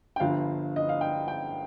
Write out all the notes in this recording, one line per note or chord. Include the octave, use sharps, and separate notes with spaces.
G5
G1 G2 F3 F5
D#5
F5
G5
G5